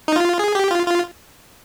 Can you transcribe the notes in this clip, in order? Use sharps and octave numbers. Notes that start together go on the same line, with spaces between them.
D#4
F4
G#4
G4
F4
F4